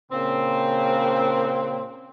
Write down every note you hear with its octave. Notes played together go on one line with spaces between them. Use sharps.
A#2 C#3 A#3 C4